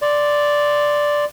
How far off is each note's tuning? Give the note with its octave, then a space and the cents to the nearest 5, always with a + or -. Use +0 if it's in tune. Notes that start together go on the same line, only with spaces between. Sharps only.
D5 +0 C6 +0